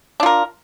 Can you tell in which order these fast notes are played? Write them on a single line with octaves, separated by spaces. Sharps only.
D4 F4 A#4